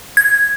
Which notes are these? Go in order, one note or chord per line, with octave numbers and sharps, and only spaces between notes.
G#6